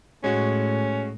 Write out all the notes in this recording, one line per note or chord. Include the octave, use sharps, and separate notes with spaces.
A2 G#3 C#4 F#4